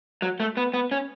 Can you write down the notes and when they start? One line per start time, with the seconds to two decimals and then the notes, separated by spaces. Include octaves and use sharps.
0.22 F#3
0.40 A3
0.57 B3
0.74 B3
0.91 C#4